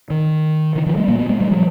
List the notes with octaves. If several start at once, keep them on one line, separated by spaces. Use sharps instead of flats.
D#3
D3 E3
D#3 F3
G3 A3
A#2 A#3
B3
G#3 A#3
G3 A3
F3 G3